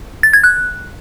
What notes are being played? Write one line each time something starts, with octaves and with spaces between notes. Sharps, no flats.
A6
G#6
F#6